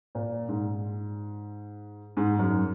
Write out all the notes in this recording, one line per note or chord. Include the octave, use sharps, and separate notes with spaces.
A#2
G#2
G#2
F#2